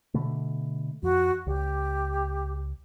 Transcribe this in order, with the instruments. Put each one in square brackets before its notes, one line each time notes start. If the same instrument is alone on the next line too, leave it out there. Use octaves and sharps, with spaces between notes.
[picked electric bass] B2 D3 A3
[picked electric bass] F2 [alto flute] F#4
[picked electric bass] C#2 [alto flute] G4